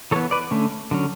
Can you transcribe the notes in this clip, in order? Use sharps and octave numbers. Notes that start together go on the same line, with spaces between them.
E3 B3 A4 C#5
B4 D5
D3 A3 C#4
D3 F#3 C#4